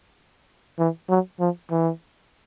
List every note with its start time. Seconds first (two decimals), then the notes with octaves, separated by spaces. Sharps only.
0.79 E3
1.10 F#3
1.40 F3
1.71 E3